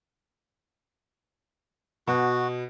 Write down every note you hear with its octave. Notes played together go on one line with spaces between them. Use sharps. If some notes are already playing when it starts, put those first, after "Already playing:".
B2 F#4